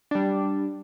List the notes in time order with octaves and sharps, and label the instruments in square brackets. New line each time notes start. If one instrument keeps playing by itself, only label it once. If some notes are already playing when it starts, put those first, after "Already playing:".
[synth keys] G3 D4